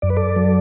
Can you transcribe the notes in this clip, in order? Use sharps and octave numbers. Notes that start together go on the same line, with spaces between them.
F#2 D5
B4
A4 D5
F#3